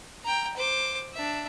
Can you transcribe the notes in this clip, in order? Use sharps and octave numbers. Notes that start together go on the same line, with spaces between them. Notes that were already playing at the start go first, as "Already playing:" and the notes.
G5 A#5
C5 D6
D4 E5